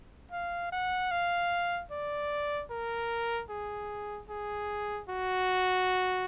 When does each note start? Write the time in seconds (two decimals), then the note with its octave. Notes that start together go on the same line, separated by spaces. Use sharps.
0.31 F5
0.72 F#5
1.11 F5
1.91 D5
2.70 A#4
3.50 G#4
4.29 G#4
5.09 F#4